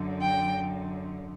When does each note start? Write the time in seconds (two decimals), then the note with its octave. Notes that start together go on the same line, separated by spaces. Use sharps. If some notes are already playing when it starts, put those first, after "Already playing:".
Already playing: F#2 D3
0.21 G5